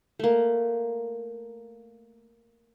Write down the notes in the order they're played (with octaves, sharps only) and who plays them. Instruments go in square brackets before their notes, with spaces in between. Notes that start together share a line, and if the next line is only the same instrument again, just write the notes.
[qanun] A3 A#3